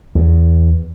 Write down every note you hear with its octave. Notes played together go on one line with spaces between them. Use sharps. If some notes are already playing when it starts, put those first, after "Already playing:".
E2